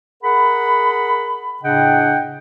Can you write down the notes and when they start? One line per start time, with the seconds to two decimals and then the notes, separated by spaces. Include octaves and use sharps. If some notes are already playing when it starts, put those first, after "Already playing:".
0.23 G#4 A#4 F#5 B5
1.63 A2 C#3 D4 D#5 F#5 G5